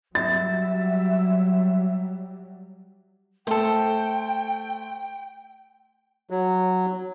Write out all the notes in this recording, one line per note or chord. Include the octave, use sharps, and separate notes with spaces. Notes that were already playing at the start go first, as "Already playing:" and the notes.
F#3 G3 E5 A6
A3 A4 C5 G5
F#3